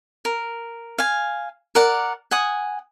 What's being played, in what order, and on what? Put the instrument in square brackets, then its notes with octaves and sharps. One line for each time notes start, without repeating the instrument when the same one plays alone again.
[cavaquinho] A#4
F5 G#5
A#4 D5 F#5
F#5 G#5 D#6